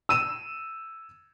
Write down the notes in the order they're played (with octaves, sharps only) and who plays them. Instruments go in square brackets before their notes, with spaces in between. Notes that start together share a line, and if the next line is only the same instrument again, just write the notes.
[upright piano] E6 D#7 E7